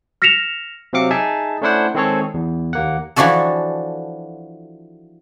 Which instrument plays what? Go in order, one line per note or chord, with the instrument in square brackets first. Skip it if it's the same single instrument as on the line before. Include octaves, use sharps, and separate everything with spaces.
[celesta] F6 A#6 B6 C#7 E7 F7
[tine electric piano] C3 F#3 C4 F5 D6 C#7
D#4 G#4 E5 G#5 A5
A3 C#4 D4 E4 C5 F#5
D#3 G#3 C4 G#4 A4 C#5
E2
D#2 A#3 F#5
[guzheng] E3 F3 D4 F#4 A4